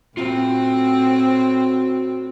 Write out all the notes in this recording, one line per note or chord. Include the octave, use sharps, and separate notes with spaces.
A2 C4 F4 F#4